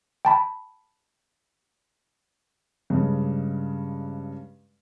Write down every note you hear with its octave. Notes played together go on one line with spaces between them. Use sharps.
G5 A5 B5
G2 C#3 G#3